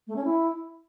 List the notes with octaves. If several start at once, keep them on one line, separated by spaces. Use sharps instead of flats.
A3
C#4
E4